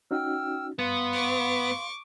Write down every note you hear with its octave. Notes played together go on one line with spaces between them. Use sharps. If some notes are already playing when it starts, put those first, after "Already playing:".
C#4 D#4 F#4 G5 E6 F6
G2 B3 F5 C6
C#6 D6